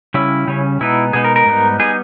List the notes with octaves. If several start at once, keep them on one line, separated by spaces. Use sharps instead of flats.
C#3 G3 C#4 E4
C#3 G3 C#4
B2 G#3 B3 D#4 E4
B2 G#3 B3 D#4 G#4
A#4
A#4
G#2 G3 B3 D#4
G3 B3 D#4 G#4